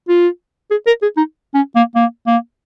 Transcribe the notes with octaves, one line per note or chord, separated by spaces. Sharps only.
F4
G#4
A#4
G#4
D#4
C#4
A#3
A#3
A#3